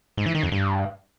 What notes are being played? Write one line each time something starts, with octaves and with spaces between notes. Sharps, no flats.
G#2
E3
D#3
F2
G2